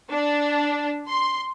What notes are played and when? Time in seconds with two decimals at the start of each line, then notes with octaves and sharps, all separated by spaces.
0.11 D4
1.08 C6